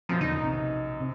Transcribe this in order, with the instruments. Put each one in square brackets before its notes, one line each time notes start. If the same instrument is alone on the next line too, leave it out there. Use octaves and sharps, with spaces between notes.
[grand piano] F#2 B2 [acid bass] F3
[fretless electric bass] E2 D3 [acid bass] D#4
[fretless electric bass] A#1 C3
C3